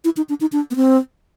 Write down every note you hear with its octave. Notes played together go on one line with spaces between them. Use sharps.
E4
D#4
D4
D#4
D4
B3
C4